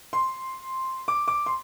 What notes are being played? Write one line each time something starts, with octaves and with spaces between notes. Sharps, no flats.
C6
D6
D6
C6